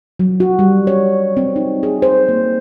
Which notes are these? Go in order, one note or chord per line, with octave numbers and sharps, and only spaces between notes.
F#3
F#4
G3
C#5
C4
D#4
G#4
C5
A#3